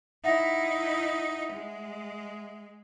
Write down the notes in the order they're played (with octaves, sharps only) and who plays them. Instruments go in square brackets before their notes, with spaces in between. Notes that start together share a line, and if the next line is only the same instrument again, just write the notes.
[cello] D#4 E4 [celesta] E5 F#5 A#6
[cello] G#3